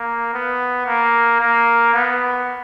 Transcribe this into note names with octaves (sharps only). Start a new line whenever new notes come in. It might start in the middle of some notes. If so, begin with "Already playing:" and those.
Already playing: A#3
B3
A#3
A#3
B3